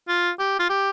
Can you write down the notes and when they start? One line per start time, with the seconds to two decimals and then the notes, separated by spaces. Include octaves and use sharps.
0.08 F4
0.40 G4
0.59 F4
0.70 G4